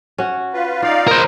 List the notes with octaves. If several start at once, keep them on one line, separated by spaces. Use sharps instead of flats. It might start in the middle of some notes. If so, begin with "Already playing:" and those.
C#4 F#4
F4 B4
D#4 F4 D5 F5
A#4 C5 D#5